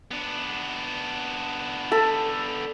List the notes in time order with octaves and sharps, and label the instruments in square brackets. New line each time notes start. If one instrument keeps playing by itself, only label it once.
[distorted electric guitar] B3 D4
[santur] A4 B5